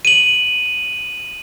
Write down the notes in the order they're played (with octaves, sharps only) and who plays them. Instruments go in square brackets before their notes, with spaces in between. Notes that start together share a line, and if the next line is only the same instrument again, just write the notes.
[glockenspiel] D#7 F#7